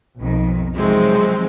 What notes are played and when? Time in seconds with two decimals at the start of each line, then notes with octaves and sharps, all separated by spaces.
0.19 B1 F2 D#3
0.75 C3 D#3 F3 F#3 G#3 C4